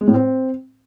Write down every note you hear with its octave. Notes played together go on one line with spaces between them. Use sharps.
G#3
A2
C4